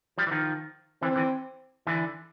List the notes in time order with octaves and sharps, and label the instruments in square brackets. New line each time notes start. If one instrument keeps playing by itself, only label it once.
[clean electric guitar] F3 G3
E3
D#3 F3
[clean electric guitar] D3 E3 [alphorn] C4
[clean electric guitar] D3 E3
D3 E3